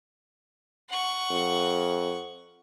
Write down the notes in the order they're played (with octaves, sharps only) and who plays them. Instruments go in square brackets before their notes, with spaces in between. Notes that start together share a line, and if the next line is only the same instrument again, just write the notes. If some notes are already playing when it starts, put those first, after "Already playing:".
[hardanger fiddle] F#5 C#6
[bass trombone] F2